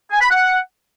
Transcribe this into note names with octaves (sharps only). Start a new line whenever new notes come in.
G#5
B5
F#5